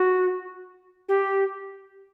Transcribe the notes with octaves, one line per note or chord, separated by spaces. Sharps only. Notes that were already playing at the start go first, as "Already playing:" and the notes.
Already playing: F#4
G4